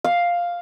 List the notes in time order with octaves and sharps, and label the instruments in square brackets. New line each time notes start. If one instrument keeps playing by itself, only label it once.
[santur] F5